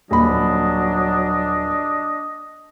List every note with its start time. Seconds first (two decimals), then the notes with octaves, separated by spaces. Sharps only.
0.11 D#1 F#3 D4 D#5 B5